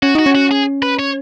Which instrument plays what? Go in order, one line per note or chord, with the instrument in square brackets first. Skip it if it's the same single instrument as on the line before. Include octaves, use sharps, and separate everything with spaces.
[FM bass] C#4 [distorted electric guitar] F#4
[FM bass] D#4 [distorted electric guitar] F#4
[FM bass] C#4
[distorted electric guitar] F#4
G#4
B4
C#5